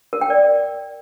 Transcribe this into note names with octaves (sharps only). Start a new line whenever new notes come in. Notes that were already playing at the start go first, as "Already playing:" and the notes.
A#4
G5
D5